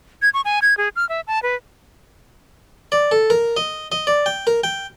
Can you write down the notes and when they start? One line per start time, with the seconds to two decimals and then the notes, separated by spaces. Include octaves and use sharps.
0.22 G#6
0.34 C#6
0.45 G#5
0.62 G#6
0.78 G#4
0.96 F6
1.09 E5
1.27 A5
1.43 B4
2.92 D5
3.11 A4
3.30 A#4
3.57 D#5
3.92 D#5
4.07 D5
4.26 G5
4.47 A#4
4.64 G5